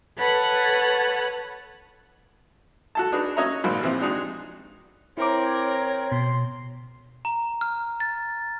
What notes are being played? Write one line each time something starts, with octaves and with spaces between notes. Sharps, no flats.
A4 B4 C#5 F#5 B5
F#4 A4 A5
D4 D#4 F#4 G#4 B4
C#4 F#4 C#5 D#5 E5 A#5
G#1 A#2 F3 F#4 C5 B5
C3 E3 F3 C4
G#3 D4 D#4 F#4 G#4
C4 E4 A#4 C#5 D6
B2 C6
A#5
F6
A6